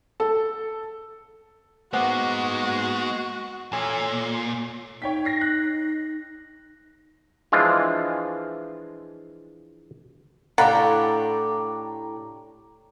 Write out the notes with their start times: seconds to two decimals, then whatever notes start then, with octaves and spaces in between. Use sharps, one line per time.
0.20 A4
1.93 G#3 A#3 B3 D#4 F#4 C5 F#5 D6
3.73 A#2 A4 C#5 G#5
5.02 D#4 C#5 G5 B6
5.25 A#6 C7
5.41 F#6
7.52 E3 F3 G#3 D4 F4
10.58 A2 D4 F4 G4 F#5 A#5 B5